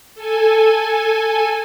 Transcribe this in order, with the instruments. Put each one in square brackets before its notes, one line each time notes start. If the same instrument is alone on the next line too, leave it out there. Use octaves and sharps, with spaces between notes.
[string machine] A4 G#5